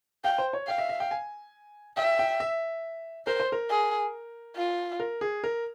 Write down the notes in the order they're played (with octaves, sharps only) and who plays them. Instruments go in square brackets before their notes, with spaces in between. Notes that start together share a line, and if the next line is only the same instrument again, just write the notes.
[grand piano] F5 [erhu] G5
[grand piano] C5
C#5
[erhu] F5 [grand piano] G5
[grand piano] E5
E5
G5
G#5
[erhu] E5 [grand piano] G5
[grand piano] G5
E5
[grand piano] A#4 [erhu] C5
[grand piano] C5
A#4
[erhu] G#4
F4
[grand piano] A#4
G#4
A#4